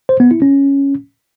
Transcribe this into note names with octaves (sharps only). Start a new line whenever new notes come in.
C5
B3
E4
C#4